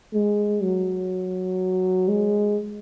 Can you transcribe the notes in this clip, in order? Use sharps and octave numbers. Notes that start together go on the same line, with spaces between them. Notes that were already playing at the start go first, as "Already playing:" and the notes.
G#3
F#3
G#3